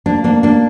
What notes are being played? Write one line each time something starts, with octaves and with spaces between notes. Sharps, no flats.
A#3 D4
A#3 D4
A#3 D4